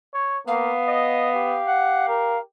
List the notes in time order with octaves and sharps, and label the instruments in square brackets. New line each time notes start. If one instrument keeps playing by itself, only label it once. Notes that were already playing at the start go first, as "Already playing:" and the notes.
[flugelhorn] C#5
[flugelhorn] A#3 [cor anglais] B3 [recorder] F5
[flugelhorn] D#5
G4
[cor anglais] F#5
A#4